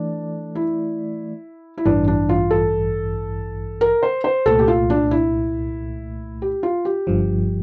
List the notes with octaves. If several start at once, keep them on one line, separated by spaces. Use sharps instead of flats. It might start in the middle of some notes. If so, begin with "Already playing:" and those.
Already playing: E3 A3 D4 D5
E4
E4
A1 G2 E3 D4
D4
F4
A4
A#4
C5
C5
C2 A#2 A3 A4
G4
F4
D4
E4
G4
F4
G4
G1 G2 F3